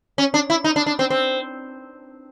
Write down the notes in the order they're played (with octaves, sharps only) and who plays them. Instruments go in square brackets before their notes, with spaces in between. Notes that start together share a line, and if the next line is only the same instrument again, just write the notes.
[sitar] C#4
D4
E4
D#4
D4
D4
C4
C4